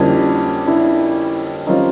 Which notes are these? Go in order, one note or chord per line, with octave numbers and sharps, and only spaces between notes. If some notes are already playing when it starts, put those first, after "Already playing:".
Already playing: F2 D3 G3 A#3 C#4 D4 E4
D4 E4
D#3 G3 C4 C#4 D#4 F4